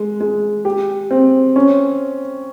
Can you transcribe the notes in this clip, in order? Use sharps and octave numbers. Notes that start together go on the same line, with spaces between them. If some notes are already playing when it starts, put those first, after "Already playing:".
Already playing: G#3
G#3
G4
C4
C#4